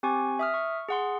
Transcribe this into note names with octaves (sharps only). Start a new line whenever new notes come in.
C4 G4 G#5 C#6
E5 D#6 F6
C#6
G#4 F#5 C6